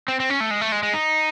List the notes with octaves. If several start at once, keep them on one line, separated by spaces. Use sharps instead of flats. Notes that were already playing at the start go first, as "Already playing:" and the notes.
C4
C4
C#4
A3
G#3
A3
G#3
G#3
D#4